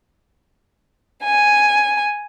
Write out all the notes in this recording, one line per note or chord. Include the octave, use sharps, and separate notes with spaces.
G#5